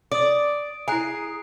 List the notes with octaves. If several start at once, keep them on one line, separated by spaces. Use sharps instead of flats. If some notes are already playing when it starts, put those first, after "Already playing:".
D5 D#6 D7
E4 G#4 G#5 A#5 F#6 C7